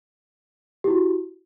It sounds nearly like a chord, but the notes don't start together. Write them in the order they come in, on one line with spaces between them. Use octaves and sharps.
G4 E4 F#4